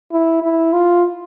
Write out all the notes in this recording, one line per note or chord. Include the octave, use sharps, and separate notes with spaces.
E4
E4
F4